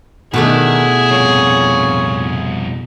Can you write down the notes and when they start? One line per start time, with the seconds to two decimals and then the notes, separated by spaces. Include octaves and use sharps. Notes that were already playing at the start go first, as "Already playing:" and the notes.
0.34 B2 D#3 A3 D4 E4 G#4
1.11 C2 F2 A#2 F4 C#5